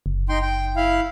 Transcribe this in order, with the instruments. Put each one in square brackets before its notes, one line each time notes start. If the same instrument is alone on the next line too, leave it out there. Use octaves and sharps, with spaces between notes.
[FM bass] F#1
[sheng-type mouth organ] D#4 G5 C6
G5
E4 F5